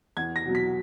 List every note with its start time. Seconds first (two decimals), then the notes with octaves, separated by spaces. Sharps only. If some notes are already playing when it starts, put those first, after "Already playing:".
0.17 E2 G#6
0.36 A#6
0.45 B2 F#3
0.55 B6